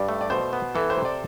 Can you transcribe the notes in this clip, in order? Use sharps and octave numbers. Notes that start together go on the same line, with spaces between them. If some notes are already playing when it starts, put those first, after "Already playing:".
Already playing: G2 D5
A3
D5
B2 C5
B3
E3 A4
C5
C3
D5